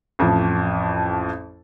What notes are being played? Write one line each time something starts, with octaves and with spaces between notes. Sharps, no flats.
A1 F2 F3